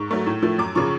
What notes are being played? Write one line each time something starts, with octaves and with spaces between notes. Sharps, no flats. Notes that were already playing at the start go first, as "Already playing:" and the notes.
Already playing: G#2 C#6
F#3 A3
A2
F3 A3
F#2 D6
C#3 F3 C#6